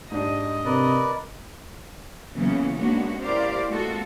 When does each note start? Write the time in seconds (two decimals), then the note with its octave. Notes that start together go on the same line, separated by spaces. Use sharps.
0.12 G#2 D4 G4 D#5
0.65 C3 A#4 B4 D5
2.34 C#3 E3 F#3 A#3 B3 C#4
2.79 G#3 A#3 B3 C#4 D4 F#4
3.21 E4 G4 A#4 C5 D5 F5
3.68 G#3 A#3 C4 F4 F#4 A4